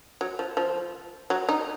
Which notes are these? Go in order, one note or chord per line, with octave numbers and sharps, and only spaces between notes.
F#3
F3
F3
F#3
D#4